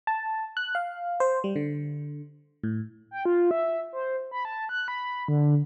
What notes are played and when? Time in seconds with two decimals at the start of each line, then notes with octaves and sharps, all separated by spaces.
0.07 A5
0.57 F#6
0.75 F5
1.20 C5
1.44 G3
1.56 D3
2.64 A2
3.11 G5
3.25 F4
3.51 E5
3.93 C5
4.31 B5
4.45 A5
4.69 F#6
4.88 B5
5.28 D3